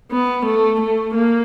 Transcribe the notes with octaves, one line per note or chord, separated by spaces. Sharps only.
B3
A3
A3
A#3